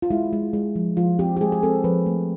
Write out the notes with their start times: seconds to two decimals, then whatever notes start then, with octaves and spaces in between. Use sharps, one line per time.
0.02 F4
0.11 G#3 E4
0.33 G#3
0.53 G#3
0.76 F3
0.97 F3 F4
1.19 C4 G4
1.37 G4
1.41 G#3 G#4
1.52 G#4
1.63 C4 A4
1.84 F3 B4
2.06 A3